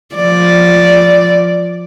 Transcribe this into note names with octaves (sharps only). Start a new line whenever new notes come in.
F3 D5